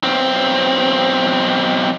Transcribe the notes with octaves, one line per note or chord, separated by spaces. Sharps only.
B1 C4